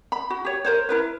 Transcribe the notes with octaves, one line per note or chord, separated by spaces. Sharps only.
B5
F#4
G4 C#5
A#4 C5 C#5
E4 A#4 B4